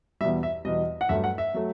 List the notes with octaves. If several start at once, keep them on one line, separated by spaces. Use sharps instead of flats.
E2 B2 G3 E5
E5
E2 B2 G3 D#5
F#5
G2 F#3 A3 E5
F#5
E5
F#3 A3